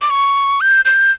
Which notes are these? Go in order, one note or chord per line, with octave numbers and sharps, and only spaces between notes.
D6
C#6
G6
G6